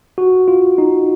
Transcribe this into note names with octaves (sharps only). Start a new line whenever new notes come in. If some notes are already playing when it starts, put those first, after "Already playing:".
F#4
F4
D#4